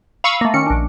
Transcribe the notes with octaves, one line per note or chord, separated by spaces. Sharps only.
F5 B5 C#6 E6 C#7 D#7
A3 A#3
D#3 C#4 C#7
A#1 D4